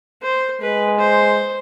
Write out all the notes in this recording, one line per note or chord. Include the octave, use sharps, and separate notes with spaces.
C5
G#3 B4
C5